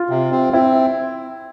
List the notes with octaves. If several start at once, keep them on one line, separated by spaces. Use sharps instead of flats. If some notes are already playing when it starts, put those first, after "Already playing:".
Already playing: F4
C3
C4
C4 E4